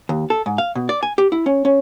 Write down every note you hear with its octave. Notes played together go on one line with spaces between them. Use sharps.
D#2
A4
G#2
F5
B2
D5
G#5
G4
E4
C#4
C#4